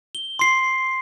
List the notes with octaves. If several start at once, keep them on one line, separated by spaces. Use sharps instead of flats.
G7
C6 C7